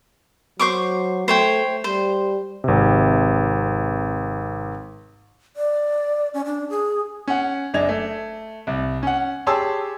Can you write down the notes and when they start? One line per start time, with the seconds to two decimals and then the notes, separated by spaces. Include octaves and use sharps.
0.59 F#3 C5 C#6 D6
1.28 A3 C5 C#5 G5
1.84 G3 C5
2.64 G#1 C3
5.56 D5
6.34 C#4
6.46 D4
6.70 G#4
7.28 C#4 F#5
7.74 F#1 F#2 D4 D#5 G#6 F7
7.89 A3
8.67 C2
9.03 C#4 F#5
9.46 G4 G#4 C#5 A5 C6 E6